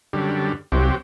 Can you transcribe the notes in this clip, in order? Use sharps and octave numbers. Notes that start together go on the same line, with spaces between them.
F#2 D3 G3
C2 F#3 C4 G4